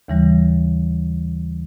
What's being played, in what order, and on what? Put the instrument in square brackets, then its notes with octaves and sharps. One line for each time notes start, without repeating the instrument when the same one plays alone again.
[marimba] D#2 C#3 E3 G3